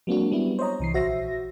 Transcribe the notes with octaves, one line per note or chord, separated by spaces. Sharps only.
F#3 G#3 A#3 C4 D4 F#4
G3 B3 E4
C5 C#5 D#5 A#5
C2 E3 C7
A#1 F#4 C5 E5 A#6